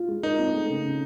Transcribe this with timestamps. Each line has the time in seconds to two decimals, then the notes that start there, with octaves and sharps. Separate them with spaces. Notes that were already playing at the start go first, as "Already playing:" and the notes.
Already playing: F4
0.08 G#3
0.23 D#4 A#4
0.39 C4
0.53 A3
0.69 C#3
0.85 C#3